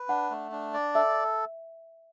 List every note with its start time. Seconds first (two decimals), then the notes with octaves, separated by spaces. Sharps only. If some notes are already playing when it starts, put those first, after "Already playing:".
Already playing: B4
0.09 D4 F#5
0.30 A3
0.52 D4
0.74 D5
0.95 A4 E5